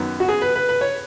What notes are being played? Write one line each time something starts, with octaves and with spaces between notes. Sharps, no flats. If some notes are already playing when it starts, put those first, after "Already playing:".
Already playing: F#2 D#3 B3
F#4
G#4
B4
B4
B4
C#5